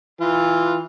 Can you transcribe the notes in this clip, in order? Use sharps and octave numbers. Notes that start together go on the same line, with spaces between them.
E3 F4